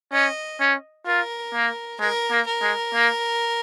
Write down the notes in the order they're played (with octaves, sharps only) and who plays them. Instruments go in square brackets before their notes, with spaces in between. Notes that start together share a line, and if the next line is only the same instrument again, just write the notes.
[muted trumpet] C#4 [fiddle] D#5
[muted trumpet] C#4
[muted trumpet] F4 [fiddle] A#4
[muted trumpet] A#3
[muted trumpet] G#3 [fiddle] A#4
[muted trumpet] A#3
[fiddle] A#4
[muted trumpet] G#3
A#3